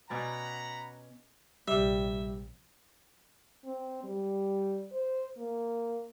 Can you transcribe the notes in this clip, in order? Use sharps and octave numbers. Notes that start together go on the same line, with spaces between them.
B2 C#4 D5 F#5 A#5 B5
A#1 C3 G3 E5
C4
G3
C5
A#3